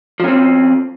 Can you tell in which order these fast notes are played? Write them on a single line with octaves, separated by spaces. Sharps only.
F3 C#4 C4